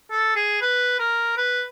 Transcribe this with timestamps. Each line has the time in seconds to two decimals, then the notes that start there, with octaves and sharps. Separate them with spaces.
0.11 A4
0.36 G#4
0.61 B4
0.99 A#4
1.37 B4